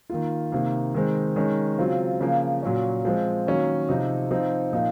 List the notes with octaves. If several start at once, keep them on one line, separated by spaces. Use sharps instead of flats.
D#3 A#3 F4
C3 D#3 A#3
D#3 G#3 C4
D#3 G#3 C#4
C#3 F#3 C4 F4
C#3 F3 A#3
A#2 F#3 C#4
F3 G#3 C4
D#3 F#3 A#3 C#4
C3 F3 C4 D#4
F3 C4 D#4
A#2 F3 A#3 D#4